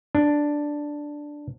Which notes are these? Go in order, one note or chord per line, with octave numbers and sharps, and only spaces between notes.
D4